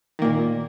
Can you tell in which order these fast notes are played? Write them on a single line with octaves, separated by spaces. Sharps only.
D#3 A#3 A#2